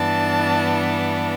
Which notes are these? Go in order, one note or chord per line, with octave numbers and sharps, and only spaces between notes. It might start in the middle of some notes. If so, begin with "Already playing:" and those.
Already playing: G2 E3 B3 D4 A5